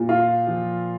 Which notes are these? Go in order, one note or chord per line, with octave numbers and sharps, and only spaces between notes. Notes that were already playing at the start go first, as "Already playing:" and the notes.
Already playing: A#2
F4
F3